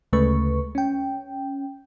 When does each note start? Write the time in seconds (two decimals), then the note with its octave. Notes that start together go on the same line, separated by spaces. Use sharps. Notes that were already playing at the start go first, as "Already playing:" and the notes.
0.13 D2 C#3 G#3 A3 B4 C#6
0.75 C#4 G5